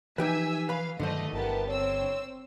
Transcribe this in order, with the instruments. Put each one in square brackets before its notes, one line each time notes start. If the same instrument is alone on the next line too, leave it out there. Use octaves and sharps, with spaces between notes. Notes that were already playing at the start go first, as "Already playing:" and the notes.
[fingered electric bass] E3 F3 [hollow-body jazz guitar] D#4 G4 B4 [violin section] E5 G#5 E6
[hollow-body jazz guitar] B4 B5 [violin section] F5
[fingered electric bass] G2 D#3 F#3 [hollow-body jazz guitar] D3 C5 [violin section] A3 D#5
[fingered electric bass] G1 [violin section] B3 G4 A5 [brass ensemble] E4 A#4
[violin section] C4 E6 [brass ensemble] C#5